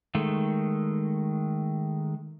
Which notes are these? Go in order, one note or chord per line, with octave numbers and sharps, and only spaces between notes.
D#3 G#3 A3